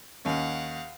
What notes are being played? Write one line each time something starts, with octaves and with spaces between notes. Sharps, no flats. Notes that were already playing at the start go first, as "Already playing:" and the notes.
D#2 C#4 F5 F#5